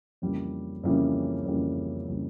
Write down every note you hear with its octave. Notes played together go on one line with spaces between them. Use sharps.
F2 C#3 E3 G3 A#3
F2 C#3 E3 G3 A#3
F2 C#3 E3 G3 A#3
C#3 E3 G3 A#3